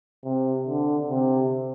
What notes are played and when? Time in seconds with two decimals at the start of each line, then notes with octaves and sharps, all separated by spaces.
0.24 C3
0.67 D3
1.10 C3